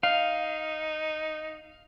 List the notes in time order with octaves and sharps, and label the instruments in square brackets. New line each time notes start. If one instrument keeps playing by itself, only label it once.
[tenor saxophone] D#4 [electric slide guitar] F5